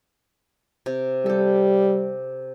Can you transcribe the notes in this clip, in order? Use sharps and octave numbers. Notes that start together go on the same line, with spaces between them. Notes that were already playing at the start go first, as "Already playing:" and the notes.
C3
G3 G4 A4